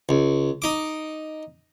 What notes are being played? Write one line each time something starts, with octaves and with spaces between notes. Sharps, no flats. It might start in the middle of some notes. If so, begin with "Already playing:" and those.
C#2
D#4 D6